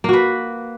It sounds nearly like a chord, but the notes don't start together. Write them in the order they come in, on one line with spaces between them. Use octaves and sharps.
A#3 F#4 B4